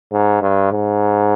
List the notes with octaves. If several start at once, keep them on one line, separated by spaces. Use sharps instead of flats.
G#2
G2
G#2